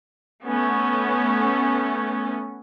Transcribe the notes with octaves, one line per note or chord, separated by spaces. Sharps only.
A3 B3 C#4